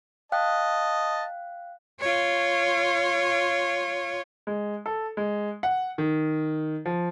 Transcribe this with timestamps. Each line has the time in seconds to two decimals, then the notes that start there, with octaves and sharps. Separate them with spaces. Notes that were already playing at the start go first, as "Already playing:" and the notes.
0.32 D#5 F5 G5 A5 F#6
2.00 F4 C#5
4.47 G#3
4.86 A4
5.17 G#3
5.63 F#5
5.98 D#3
6.85 F3